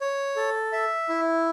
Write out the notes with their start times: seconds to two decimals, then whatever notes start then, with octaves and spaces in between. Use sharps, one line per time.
0.01 C#5
0.36 A4
0.72 E5
1.09 E4